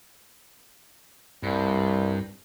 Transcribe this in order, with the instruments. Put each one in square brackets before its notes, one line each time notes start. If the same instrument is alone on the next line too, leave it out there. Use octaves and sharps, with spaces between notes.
[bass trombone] C2 [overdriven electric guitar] G2